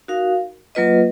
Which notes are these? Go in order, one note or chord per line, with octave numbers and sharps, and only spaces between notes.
D#4 F#4 A#4 F5
F#3 A#3 F4 B4 D#5